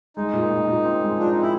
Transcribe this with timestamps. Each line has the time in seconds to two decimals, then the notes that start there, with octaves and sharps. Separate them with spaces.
0.16 G#3 D#4
0.33 A#2
0.50 A#2
0.67 A#2
0.85 C4
1.02 G#3
1.18 F3 D4
1.31 C4 D#4
1.42 E4